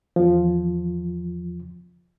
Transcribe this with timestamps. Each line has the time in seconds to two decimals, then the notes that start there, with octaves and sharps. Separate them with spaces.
0.16 E2 F3